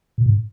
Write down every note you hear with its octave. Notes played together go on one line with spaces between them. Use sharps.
A#2
G#2